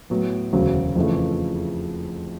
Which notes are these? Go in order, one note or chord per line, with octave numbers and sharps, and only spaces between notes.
A2 F#3 B3
E1 D2 C#3 F#3
F2 C#3 E3 A3